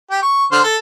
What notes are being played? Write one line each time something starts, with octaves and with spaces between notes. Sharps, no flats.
G4
C#6
D3 C5 F6
A4